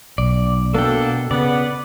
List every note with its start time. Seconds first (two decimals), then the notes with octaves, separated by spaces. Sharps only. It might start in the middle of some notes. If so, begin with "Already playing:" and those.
0.18 B1 D5
0.74 B2 A#3 D4 F#4 A4 G5
1.31 C#3 B3 D5